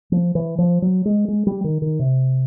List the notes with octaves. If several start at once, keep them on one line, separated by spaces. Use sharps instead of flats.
F3
E3
F3
F#3
G#3
G#3
G3
D#3
D#3
C3